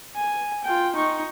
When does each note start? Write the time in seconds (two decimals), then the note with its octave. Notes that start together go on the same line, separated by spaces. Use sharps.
0.16 G#5
0.64 F4 G5
0.95 D#4 C#6